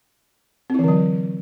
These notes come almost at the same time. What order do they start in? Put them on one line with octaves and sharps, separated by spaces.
C4 E4 E3 D3 F#3